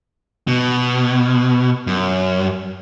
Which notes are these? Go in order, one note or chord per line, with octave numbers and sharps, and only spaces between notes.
B2
F#2